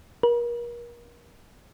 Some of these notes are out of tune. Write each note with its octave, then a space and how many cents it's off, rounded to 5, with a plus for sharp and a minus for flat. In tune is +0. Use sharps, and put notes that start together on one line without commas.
A#4 +35